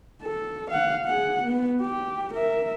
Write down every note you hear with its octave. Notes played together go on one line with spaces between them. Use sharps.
A4
F5 F#5
G#4 F#5
B3
G4
A#4 E5